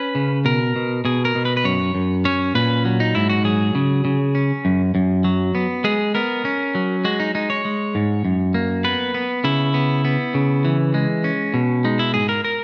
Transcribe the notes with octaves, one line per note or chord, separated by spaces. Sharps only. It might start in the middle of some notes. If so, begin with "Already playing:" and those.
Already playing: C#4 B4
C#3
B2 A#4
B2
B2 G#4
A#4
B2
B4
B4
F#2 C#5
F#2
C#4 C#5
A#2 B4
F#3
D#4
G#2 E4
F#4
F#3 G#4
C#3
C#3
C#4
F#2
F#2
F#3
B3
G#3 G#4
B3 A#4
C#4
F#3
G#3 F#4
D#4
G#3 D#4
C#5
G#3
G#2
F#2
A#3
B3 B4
B3
C#3 E4
B3
B3
C#3
E3
G#3
C#4
B2
G#3 D#4
E4
G#2 G#4
A#4
A#4